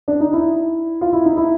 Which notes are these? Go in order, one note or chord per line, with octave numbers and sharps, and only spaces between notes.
D4
D#4
E4
F4
E4
D#4
E4